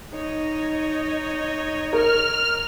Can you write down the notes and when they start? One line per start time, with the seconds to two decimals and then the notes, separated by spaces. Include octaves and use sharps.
0.14 D#4 C#5 D#5
1.93 A#4 F6